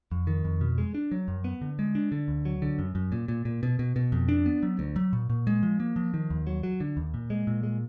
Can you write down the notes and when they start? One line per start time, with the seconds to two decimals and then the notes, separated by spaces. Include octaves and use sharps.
0.12 F2
0.27 D#3
0.44 F2
0.61 B2
0.78 G#3
0.95 D4
1.11 F#3
1.28 F#2
1.44 B3
1.61 D3
1.79 G#3
1.95 D4
2.12 D3
2.28 D2
2.45 F#3
2.62 D3
2.79 F#2
2.95 F#2
3.12 A#2
3.28 A#2
3.45 A#2
3.63 B2
3.79 B2
3.96 B2
4.12 F2
4.29 D4
4.46 B3
4.63 F#3
4.79 D2
4.96 F#3
5.13 A#2
5.30 A#2
5.47 G#3
5.63 F3
5.80 A#3
5.96 F3
6.14 D#3
6.30 D#2
6.47 F#3
6.63 F#3
6.80 D3
6.97 D#2
7.14 A#2
7.30 G#3
7.47 A#2
7.63 G#3